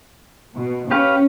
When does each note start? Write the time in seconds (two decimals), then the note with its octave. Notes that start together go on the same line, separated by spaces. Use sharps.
0.58 B2
0.91 C#4 G4 B4 F5